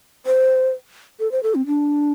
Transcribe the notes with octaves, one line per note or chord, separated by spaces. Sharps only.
C5
A4
C5
A4
C4
D4